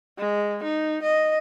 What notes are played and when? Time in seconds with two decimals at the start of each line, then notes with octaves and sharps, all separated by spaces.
0.18 G#3
0.63 D#4
1.02 D#5